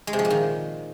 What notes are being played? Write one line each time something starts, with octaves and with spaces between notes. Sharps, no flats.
G#3
C3
F3
A#2
D#3